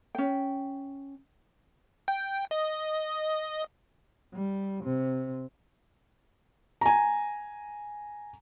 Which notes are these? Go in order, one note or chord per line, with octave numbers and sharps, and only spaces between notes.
C#4 G5
G5
D#5
G3
C3
G#5 A#5